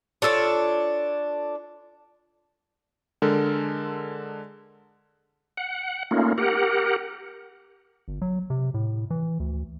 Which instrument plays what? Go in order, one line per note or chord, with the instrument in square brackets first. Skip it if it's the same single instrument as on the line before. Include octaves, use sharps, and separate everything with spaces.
[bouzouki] D4 F4 A4 C#5
[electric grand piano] D3 G#3 A4 A#4
[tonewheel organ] F#5
A3 A#3 C#4 D#4 F4
G4 A#4 F#5
[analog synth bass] G1
F#3
C3
A2
E3
D2